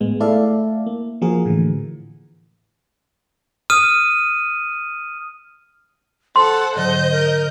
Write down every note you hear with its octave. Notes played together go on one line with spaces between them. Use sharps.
A2 G#3 B3
A3 E4 A4 D5 E5 F5
A#3
F3 A#3 F#4 G#4 A#4
A2 D3 E3
D#6 F6 D#7
A4 C5 F#5 C6
G#2 D3 F#3 D#5 G6
A#4